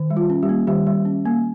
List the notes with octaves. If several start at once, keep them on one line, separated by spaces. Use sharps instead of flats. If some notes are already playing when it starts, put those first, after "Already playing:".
Already playing: D#3
G3
F4
C#4
G3 G4
A#3
D#3 G3 G4
G3
C#4
A#3